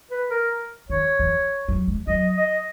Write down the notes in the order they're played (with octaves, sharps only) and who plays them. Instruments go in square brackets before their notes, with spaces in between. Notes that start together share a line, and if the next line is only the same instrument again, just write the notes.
[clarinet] B4
A#4
[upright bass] D#3 [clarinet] C#5
[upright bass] E3
F#3
G#3
[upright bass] F#3 [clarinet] D#5
[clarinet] D#5